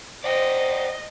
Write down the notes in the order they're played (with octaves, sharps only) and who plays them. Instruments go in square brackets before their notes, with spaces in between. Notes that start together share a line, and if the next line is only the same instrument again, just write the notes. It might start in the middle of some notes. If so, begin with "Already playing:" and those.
[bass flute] C5 [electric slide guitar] D5 F#5 G5 [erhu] D#5